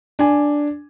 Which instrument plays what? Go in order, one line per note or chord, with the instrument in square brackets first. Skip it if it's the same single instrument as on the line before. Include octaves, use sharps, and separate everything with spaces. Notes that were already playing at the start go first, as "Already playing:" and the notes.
[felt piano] D4 G#5